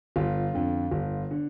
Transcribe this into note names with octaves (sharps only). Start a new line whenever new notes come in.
G1 F4
F2 D3
G1
D3